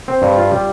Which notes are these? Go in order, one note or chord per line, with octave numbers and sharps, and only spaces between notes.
C4
G2
F4
G3